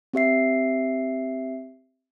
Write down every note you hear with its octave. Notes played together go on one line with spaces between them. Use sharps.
C4 G4 E5 C7